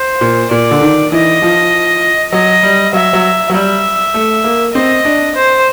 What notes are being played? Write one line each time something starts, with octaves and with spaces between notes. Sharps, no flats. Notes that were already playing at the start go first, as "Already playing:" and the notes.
Already playing: C5
A#2
A#2 D5
D3
D#3
E3 D#5
F3
F#3 D#5
G3
F#3 E5
F#3
F#3
G3 E5
A3
A#3
C4 D#5
D4
C5